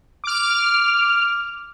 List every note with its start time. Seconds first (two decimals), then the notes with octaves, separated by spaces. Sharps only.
0.24 D6 F6